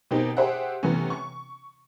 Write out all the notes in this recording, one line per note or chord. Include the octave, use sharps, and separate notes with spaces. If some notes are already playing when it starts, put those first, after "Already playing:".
B2 D#3 C4 D#4 G4
G4 G#4 C5 E5 F#5
C3 E3 A3 B3 C#4
C#6